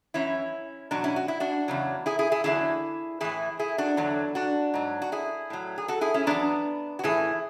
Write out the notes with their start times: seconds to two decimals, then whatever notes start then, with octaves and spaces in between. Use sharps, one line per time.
0.14 F#2 E3 C#4 E4
0.91 E2 B2 F#3 D4 F#4
1.04 C#4 E4
1.16 F#4
1.28 E4
1.40 D4 F#4
1.68 E2 C#3 F#3
2.06 E4 G#4
2.19 E4 G#4
2.32 E4 G#4
2.44 E2 D3 F#3 E4 G#4
3.21 A2 E3 E4 G#4
3.59 E4 G#4
3.78 D4 F#4
3.97 E2 D3 F#3
4.35 D4 F#4
4.74 G#2 F#3
5.02 F#4
5.12 E4 G#4
5.50 A2 F#3
5.78 G#4
5.88 F#4 A4
6.01 E4 G#4
6.14 C#4 E4
6.26 E2 B2 F#3 B3 D4
6.99 F#4
7.04 A2 E3 E4 G#4